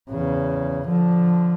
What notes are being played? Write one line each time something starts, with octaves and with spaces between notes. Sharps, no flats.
E2 C#3
D3 F3